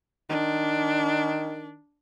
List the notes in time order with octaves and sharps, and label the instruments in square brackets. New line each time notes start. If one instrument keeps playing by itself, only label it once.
[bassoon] D#3 [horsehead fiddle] D4